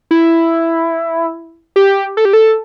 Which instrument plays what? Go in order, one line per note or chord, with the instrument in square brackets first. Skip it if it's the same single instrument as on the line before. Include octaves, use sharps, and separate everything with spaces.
[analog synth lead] E4
G4
A4
G4
A4